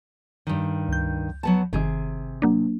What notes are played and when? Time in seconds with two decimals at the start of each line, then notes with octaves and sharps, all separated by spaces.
0.47 G2 D#3
0.88 C#2 G6
1.43 F#3 B3 A5
1.73 G1 C3 D#3 G#4
2.42 F#3 A#3 D4